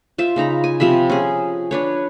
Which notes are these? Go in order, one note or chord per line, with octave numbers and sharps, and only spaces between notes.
F4 C5 E5
C#3 D#4 A#5 B5
G#5
C3 F3 E5 B5
C#4 G#4
D4 B4 C#5